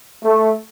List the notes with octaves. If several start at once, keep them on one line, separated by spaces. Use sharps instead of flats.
A3